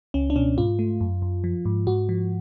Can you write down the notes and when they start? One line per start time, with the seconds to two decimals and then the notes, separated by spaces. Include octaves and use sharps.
0.14 C#2 C#4
0.30 D4
0.36 B2 C#4
0.57 G#2 F4
0.79 A3
1.01 F#2
1.22 F#2
1.44 F3
1.65 G#2
1.87 G#2 F#4
2.09 F3